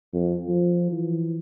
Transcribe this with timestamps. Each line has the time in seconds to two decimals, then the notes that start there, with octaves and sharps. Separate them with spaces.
0.13 F2
0.48 F3
0.92 E3